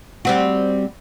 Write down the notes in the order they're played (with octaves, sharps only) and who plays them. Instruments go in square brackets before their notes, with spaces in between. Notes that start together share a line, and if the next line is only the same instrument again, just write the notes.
[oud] G3 C4 F#4